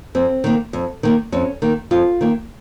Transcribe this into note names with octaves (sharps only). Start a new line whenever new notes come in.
F2 C4
D#3 A#3
F2
D#3 A#3
F2 C#4
D#3 A#3
F2 F4
D#3 A#3